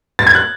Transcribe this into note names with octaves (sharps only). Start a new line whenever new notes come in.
A6
G#6
F#6